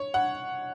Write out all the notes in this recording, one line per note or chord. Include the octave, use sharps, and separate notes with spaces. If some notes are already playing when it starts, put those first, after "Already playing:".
Already playing: C#5
F#5